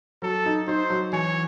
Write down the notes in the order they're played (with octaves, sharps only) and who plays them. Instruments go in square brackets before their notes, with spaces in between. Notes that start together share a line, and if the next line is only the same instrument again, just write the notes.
[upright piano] F#3 [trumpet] A4
[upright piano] D#4
[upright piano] D#4 [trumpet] C5
[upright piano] F#3
[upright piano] E3 [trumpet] C#5